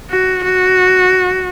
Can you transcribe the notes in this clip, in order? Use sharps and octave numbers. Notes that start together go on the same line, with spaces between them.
F#4
F#4